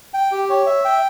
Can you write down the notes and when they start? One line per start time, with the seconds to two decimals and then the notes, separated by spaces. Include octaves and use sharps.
0.14 G5
0.32 G4
0.50 C#5
0.66 E5
0.85 G5